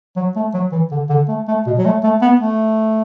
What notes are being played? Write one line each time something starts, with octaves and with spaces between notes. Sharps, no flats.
F#3
A3
F#3
E3
D3
D3
A3
A3
B2
F#3
A3
A3
B3
A3